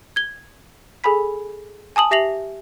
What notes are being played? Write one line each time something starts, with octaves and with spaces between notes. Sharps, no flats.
G#6 G7
G#4 A4 G#5 B5 B6
G#5 A5 D#6 F#7
G4 E5 A#6 C7 F7 F#7